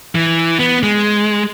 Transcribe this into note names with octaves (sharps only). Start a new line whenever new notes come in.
E3
B3
G#3